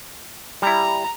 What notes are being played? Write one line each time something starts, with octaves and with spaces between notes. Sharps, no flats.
G3 E4 A#5